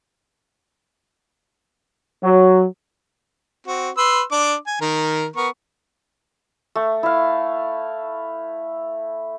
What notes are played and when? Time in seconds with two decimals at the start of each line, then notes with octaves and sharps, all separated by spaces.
2.22 F#3
3.67 C4 F#4
3.97 B4 C6 E6
4.31 D4 D6
4.67 G#5
4.81 D#3 A#4
5.36 B3 A#4 C#6
6.76 A3
7.03 E4 F5